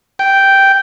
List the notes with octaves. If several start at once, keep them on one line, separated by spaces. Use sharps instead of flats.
G5